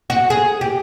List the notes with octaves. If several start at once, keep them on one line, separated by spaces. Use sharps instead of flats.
F#4
G#4
G4